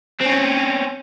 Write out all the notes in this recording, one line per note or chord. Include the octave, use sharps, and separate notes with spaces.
C4 C#4